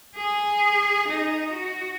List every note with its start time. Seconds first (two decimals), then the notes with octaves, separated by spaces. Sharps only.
0.16 G#4
1.07 D#4
1.53 F#4